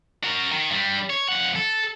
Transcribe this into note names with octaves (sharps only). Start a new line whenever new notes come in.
F#4 A#4
D#3
G2 G3
C#5
F2 F#5
A4